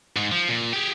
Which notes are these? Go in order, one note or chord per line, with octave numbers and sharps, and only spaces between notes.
G#2
F3
A#2
G4 G#4